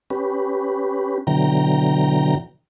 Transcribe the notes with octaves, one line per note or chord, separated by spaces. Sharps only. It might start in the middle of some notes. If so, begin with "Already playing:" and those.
C#4 G4 B4
B2 D3 E3 F#3 G5 A#5